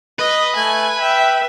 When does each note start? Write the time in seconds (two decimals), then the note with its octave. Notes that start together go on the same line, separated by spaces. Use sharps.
0.19 B4 D#5
0.56 A3 G#5
1.01 E5 G5